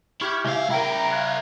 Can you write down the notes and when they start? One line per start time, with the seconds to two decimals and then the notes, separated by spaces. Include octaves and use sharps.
0.21 E4 G4 C#6 F6 G#6
0.45 C#2 E4 E5 F5 G#5
0.70 E4 A#4 G5 A#5
1.11 F5 F#6 G#6